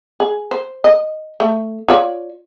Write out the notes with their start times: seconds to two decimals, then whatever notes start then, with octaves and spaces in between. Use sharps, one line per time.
0.20 G#4
0.51 C5
0.84 D#5
1.40 A3
1.88 F4 C#5 D5